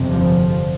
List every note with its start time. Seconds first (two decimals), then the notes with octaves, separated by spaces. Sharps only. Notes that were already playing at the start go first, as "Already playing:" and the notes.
Already playing: G1 F2 C3
0.11 D3 F3